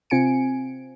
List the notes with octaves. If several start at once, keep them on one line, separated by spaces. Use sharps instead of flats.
C3 C4 F4 G#5 C#7 D7